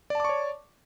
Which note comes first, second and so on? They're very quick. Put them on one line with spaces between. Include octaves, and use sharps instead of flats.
D5 A5 D6 C#6 C#5